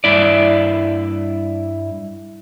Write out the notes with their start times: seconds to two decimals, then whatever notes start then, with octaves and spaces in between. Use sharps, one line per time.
0.04 G2 E4 D5